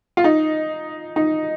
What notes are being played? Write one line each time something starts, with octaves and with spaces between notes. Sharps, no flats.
F4
D#4
D#4